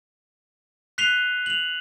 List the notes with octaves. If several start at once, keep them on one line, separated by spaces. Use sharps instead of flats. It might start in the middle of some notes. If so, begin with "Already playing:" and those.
F#6 B6 C7 D#7 F7 G7
F7 F#7